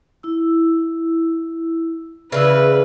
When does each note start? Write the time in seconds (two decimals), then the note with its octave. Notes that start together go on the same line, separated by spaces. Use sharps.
0.23 E4 E6
2.32 C#3 E3 B4 D5 E6